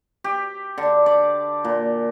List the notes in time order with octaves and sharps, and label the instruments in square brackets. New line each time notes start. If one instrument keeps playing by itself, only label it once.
[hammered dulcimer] G4
D3
D5
A#2